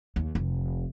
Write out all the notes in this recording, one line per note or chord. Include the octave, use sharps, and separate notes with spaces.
D#2
F1